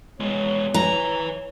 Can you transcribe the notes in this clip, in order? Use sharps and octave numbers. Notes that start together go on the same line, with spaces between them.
G#3 B3 C#5
B4 E5 A#5